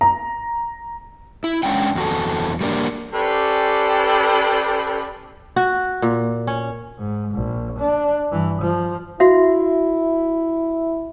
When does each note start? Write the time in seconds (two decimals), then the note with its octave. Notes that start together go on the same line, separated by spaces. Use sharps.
0.01 A#5
1.44 E4
1.63 G#3 C#4 D4 F#5 G5
1.95 E2 F#4 A4
2.61 G3 A#3 D4
3.13 C#4 G4 A4 B4 C5 D5
5.56 F#4
6.02 A#2
6.47 C#4
6.98 G#2
7.34 A#1
7.79 D4
8.31 G2 E3
8.62 F3
9.20 E4 F#4 E5 F5